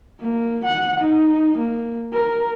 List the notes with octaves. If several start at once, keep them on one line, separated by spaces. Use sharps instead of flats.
A#3
F#5
D#4
A#3
A#4